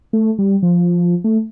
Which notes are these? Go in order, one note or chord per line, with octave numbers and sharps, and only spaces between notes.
A3
G3
F3
A3